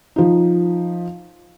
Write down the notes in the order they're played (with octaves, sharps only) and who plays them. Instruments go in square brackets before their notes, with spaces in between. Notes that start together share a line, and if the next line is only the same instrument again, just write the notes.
[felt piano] F3 D#4